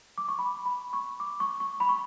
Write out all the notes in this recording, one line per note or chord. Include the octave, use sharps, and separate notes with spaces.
D6
C#6
B5
B5
C#6
D6
C#6
C#6
B5
C#6